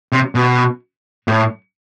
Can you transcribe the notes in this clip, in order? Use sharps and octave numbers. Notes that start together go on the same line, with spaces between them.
C3
B2
A2